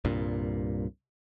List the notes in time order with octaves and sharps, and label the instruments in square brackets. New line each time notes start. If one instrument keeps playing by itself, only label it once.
[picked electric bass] C2 G2 A#2